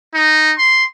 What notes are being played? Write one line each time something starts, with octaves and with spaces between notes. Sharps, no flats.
D#4
C6